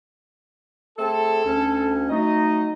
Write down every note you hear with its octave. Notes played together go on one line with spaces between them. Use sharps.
A3 C4 G#4 A4
D2 C#4
F#3 A3 D#4 D#5